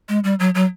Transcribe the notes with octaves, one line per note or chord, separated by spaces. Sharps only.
G#3
G3
F#3
F#3